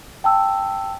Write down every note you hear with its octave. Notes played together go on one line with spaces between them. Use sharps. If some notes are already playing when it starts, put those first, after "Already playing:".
G5 A5 E6